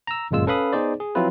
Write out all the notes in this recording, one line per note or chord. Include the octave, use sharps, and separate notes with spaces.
A#5 E6
G1 F#2 A#2 G#3 F4 E6
C#4 A4 B4 F5 B5 D#6
B3 D#4 G#4 C5 D5
G#4
F3 F#3 C4 E4 F4 B4